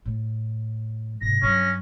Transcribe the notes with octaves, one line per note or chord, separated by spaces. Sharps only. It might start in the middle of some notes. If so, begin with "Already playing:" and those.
A2
G#2 C3 A#6
G2 F#3 C#4